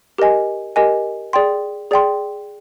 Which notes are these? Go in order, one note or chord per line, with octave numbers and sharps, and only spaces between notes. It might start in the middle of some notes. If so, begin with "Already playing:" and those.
G4 A#4 D#5 G#5
G4 A#4 D#5 G#5
G#4 D5 G5 C6
G#4 D5 G5 C6